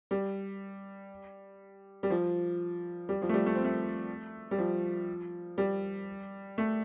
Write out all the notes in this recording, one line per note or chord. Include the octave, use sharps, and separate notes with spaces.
G3
G3
F3
G3
F3
A3
G3
A3
C4
A3
G3
F3
G3
A3